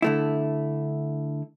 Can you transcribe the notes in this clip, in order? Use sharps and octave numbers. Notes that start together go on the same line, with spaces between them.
D3 A3 E4